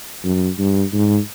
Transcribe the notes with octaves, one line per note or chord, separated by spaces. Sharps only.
F#2
G2
G#2